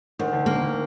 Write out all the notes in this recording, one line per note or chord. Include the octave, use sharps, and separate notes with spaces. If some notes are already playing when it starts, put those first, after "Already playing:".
D2 D#3
D3
D3 A#3
D3